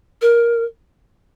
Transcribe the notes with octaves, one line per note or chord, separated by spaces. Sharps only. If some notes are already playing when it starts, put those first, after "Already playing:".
A#4